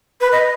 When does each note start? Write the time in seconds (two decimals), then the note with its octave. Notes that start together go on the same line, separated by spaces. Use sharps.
0.21 B4
0.32 D#5